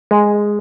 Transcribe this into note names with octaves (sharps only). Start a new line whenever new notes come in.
G#3